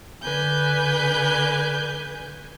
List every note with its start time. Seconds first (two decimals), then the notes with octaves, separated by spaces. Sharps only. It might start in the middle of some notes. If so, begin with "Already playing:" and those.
0.23 D3 B4 G#5 G6